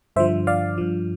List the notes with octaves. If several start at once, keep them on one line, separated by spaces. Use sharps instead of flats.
G2 D3 F3 C5 E5
D5 F5
G2 F3